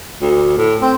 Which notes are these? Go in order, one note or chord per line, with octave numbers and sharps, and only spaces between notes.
D2
A2
C4